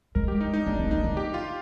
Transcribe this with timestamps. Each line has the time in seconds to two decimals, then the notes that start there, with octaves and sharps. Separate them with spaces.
0.15 G#3 A#4
0.28 G4
0.41 D#4
0.54 D#4
0.66 A#3 D4
0.79 C4
0.91 A#3 D#4
1.04 D3
1.17 G4
1.34 F4